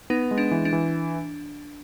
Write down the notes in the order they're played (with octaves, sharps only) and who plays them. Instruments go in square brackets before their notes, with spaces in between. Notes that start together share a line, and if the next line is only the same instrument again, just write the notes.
[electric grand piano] B3 [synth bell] D#4
[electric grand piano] G#3
[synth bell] D4
[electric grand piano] E3
[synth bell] D4
[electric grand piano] E3